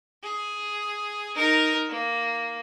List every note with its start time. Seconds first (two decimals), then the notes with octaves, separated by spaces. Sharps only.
0.23 G#4
1.36 D#4 A#4
1.89 A#3